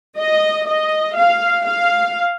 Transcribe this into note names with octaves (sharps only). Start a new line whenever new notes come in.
D#5
D#5
F5
F5